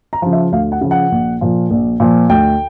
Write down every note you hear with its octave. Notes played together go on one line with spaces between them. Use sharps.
A#5
C#3 F3
E5
D2 F5
F#5
C#3 F3
F#5
A#1
A#2 F3
A#1
A#2 F3
D2 G5